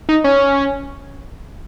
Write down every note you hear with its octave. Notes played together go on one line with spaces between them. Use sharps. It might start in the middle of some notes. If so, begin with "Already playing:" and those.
D#4
C#4